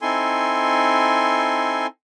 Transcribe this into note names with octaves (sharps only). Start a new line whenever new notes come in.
C4 D#4 E4 A4 G#5 C6